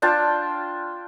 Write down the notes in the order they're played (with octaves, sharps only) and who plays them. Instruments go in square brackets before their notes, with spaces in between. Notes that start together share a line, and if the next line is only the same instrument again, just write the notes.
[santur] D4 F4 G5 A5